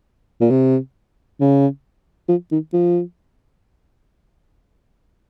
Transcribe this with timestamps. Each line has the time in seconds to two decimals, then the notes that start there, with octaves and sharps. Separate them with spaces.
0.41 A#2
0.50 C3
1.40 C#3
2.28 F3
2.51 D#3
2.73 F3